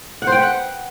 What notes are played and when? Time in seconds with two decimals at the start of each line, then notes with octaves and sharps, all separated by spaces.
0.22 F#5
0.27 C5
0.32 G5
0.37 B4
0.42 F#5